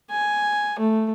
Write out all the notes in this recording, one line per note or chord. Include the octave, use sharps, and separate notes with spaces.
G#5
A3